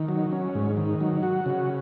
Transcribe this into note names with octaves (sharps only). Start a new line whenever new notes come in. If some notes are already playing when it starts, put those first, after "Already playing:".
Already playing: D#3
F#3
C#4
G#2
D#3
F#3
F#4
C#3